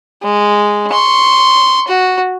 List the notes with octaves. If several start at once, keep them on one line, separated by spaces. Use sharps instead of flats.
G#3
C6 C#6
F#4